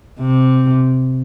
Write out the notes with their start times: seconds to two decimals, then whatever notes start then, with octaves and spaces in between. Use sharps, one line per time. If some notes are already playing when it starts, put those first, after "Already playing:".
0.20 C3